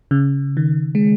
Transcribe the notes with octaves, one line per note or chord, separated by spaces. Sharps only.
C#3
D#3
G#3